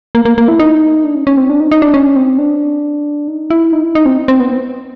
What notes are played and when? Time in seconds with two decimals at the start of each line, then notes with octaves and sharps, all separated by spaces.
0.15 A#3
0.25 A#3
0.38 A#3
0.48 E4
0.60 D#4
1.04 D4
1.15 C#4
1.27 C#4
1.37 C4
1.50 D4
1.60 D#4
1.71 D#4
1.82 D4
1.94 C#4
2.16 C4
2.38 D4
3.28 D#4
3.50 E4
3.72 D#4
3.84 E4
3.95 D#4
4.06 C4
4.28 C4
4.40 B3